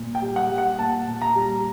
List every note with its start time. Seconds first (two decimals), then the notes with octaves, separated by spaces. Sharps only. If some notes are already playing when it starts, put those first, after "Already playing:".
Already playing: A#2
0.15 G5
0.22 G3
0.36 F#5
0.51 G3
0.58 F#5
0.79 A#2 A5
1.07 A#2
1.21 A#5
1.35 G3